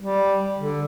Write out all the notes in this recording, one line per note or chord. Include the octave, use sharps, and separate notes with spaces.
G3
D3